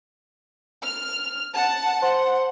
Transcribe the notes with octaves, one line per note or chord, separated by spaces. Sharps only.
F6
F#5 A5
C5 F#5